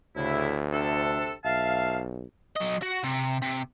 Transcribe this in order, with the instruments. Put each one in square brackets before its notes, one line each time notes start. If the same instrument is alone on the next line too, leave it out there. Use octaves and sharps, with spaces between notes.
[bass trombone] D2 [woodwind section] A2 C#3 E4
[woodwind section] C3 D4 A4
[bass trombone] B1 [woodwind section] E5 F5 A5
[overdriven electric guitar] F#3 D#5
F#4
C3
C3